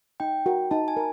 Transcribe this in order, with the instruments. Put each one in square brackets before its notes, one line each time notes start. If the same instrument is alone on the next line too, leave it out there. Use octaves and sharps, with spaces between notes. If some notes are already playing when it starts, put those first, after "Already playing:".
[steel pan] D#4 [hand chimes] G5
[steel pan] F#4 A#4
[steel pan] D#4 [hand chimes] A5
[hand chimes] G#5
[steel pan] A#4